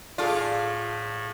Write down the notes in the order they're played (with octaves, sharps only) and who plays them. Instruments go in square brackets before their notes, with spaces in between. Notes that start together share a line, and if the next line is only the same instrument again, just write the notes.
[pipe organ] A2 [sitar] F4 [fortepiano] G#4 A4 D5